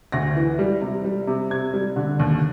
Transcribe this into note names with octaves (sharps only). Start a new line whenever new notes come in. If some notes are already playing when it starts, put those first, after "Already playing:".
D2 A#6
E3
G3
C3
G3
C3
C3 G#6
G3
D3
D#2